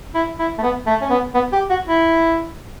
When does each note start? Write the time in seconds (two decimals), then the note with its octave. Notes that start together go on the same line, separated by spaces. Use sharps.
0.15 E4
0.39 E4
0.58 A3
0.62 B3
0.87 A3
1.01 C#4
1.10 B3
1.34 B3
1.53 G4
1.70 F#4
1.88 E4